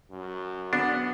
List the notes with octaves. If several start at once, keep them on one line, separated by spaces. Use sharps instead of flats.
F#2
B3 D4 F#5